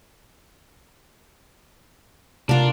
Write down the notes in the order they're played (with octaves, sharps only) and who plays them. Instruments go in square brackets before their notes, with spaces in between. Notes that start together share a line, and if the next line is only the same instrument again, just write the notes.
[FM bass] C3 [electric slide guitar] D4 [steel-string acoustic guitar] F4 A#4